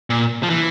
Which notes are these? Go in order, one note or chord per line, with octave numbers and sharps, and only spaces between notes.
A#2
F3
E3